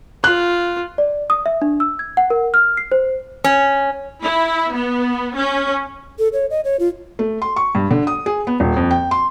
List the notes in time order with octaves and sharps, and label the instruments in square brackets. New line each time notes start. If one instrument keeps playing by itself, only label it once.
[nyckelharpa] F4 [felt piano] F#6
[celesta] D5
D#6
E5
D4
E6
G#6
F#5
A#4
F6
C7
C5
[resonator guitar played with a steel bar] C#4
[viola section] E4
B3
C#4
[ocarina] A4
C#5
D#5
C#5
F4
[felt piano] A3
C6
C#6
G2
D3
D#6
G#4
B3
D#1
F2
G5
C6